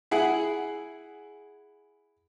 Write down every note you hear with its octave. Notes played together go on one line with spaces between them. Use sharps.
E4 G#4 F#5